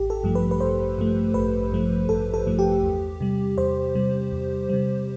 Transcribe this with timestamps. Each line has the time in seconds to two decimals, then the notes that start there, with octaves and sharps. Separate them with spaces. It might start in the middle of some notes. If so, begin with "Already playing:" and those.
Already playing: A1 G4
0.10 A4
0.24 G2 F3 A3
0.35 B4
0.51 B4
0.61 A1 C5
0.98 G2 F3 A3
1.34 A1 B4
1.72 G2 F3 A3
2.09 A1 A4
2.34 A4
2.47 G2 F3 A3
2.59 G4
2.84 E2
3.21 C3 G3
3.58 E2 C5
3.95 C3 G3
4.32 E2
4.69 C3 G3